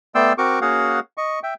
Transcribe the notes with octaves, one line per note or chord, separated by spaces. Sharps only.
A3 B3 D5 G5 C6 E6
C4 F#4 A#4 C#6 D6
A#3 C#4 F#4 G#4 F5 F#5
D#5 C#6
E5 G5